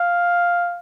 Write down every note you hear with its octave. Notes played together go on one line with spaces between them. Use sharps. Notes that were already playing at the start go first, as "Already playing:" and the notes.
Already playing: F5